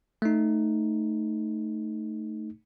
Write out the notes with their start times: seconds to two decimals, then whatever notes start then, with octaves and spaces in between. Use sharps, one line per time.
0.22 A3 D#4